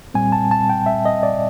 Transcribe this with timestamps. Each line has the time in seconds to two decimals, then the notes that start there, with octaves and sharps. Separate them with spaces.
0.14 A#2 G3 C4 G#5
0.32 A5
0.51 A5
0.70 G5
0.86 E5
1.05 D#5
1.23 D5